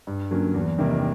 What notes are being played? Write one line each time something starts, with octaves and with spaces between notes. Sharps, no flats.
G2
D3 F#3 A#3 C#4
E2
C3 D#3 G3 A#3